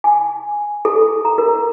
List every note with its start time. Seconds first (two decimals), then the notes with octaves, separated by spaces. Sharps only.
0.04 G#5
0.85 A4
1.25 A#5
1.38 A#4